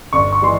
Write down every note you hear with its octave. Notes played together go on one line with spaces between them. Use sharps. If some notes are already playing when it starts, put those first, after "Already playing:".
G1 C#6
C#6
E3 G#3 C6